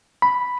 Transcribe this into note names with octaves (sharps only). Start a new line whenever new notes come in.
B5